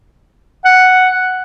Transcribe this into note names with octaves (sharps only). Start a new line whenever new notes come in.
F#5